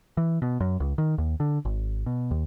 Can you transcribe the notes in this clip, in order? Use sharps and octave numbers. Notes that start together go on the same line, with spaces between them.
E3
B2
F#2
C#2
D#3
D#2
D3
G#1
B2
D#2